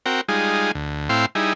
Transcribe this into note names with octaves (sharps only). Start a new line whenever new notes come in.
C4 F#4 A#4 G5
G3 G#3 D#4 F4 G#4
D2
A2 C4 E4 F5 G5 C6
G3 D#4 E4 G#4